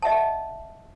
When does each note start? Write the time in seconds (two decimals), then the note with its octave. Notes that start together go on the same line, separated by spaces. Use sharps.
0.02 D#5 E5 F#5 A5